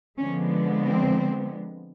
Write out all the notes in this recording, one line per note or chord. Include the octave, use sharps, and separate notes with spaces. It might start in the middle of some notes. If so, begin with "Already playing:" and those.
D3 F3 G#3 B3 C#4
C4